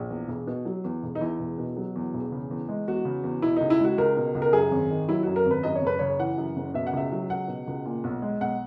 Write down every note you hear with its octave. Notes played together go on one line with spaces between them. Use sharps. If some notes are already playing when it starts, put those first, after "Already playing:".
Already playing: A#1
E2
E1
B2
F#3
E2
E1
D#4
E2 E4
E1
B2
F#3
E2
E1
C#3
E2
G#3
E2 F#4
C#3
E2
B2 E4
C#2 D#4
E4
G#3 F#4
C#2 A#4
B2
C#2
A#4
F#2 G#4
G#1
D#3
F#3 E4
F#2 F#4
A#4
G#1
B4
F#2 D#5
C#5
F#1 B4
C#3 C#5
E3 F#5
F#2
F#1
B2 E5
F#5
C#2 E5
F#3
C#2 F#5
B2
C#2
A#2
B1
G#3
B1 F#5